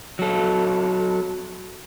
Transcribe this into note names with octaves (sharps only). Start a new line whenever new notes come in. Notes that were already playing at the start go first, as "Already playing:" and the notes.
F#3 A4